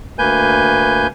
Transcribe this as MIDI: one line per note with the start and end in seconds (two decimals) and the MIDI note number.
0.18 1.07 38
0.18 1.07 58
0.18 1.07 71
0.18 1.07 80
0.18 1.07 91